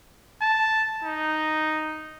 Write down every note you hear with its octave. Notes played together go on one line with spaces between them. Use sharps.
A5
D#4